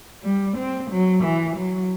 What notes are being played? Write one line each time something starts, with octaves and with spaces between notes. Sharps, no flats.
G3
C4
F#3
E3
F#3